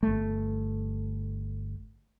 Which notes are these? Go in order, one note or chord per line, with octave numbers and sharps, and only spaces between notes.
G1 A3